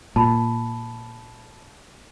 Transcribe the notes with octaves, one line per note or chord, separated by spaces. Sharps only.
A#2 A5 B5